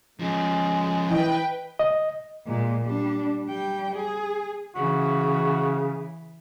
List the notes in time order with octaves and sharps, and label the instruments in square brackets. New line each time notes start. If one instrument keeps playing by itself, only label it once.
[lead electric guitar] F3 C#4 [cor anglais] G#3
[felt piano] E3 D#5 [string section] B4 G5
[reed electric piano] D#5
[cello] A#2 G#3
G3 D4
G3 G5
G#4
[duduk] C#3 [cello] E3 [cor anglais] F#4